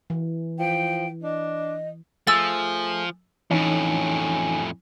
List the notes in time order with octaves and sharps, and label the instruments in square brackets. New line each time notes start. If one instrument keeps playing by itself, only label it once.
[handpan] E3
[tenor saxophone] F3 [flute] G5
[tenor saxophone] D4 [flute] D#5
[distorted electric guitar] F3 [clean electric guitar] A3 G#4 [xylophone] E6 A6
[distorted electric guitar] F2 A2 [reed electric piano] E3 D#4 [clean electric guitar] C#4